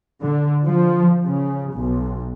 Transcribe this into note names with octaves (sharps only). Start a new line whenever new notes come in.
D3
F3
C#3
B1